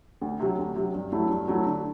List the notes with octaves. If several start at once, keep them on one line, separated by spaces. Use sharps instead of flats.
D2
C3 F#3
D2
C3 F#3
G2
F#3 A3 E4
G2
F#3 A3 E4
D3